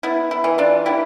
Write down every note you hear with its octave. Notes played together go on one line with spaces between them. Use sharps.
B3 E4
E4
E3
D4 F4
B3 E4 G4